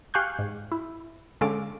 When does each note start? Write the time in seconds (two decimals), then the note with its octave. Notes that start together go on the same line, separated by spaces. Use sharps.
0.14 G4 F5 G#5 C#6 F#6 G6
0.39 G#2
0.72 E4
1.41 D3 G#3 C#4 A4 F5 D6